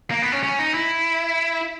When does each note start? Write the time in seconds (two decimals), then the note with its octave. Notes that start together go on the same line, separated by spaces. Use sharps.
0.11 A#3
0.22 B3
0.32 C#4
0.43 C#4
0.59 D#4
0.74 E4